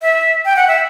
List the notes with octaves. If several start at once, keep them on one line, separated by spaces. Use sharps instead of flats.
E5
G5
F#5
E5